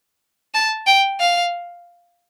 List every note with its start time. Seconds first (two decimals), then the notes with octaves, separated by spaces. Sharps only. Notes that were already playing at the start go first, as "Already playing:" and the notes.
0.54 A5
0.87 G5
1.20 F5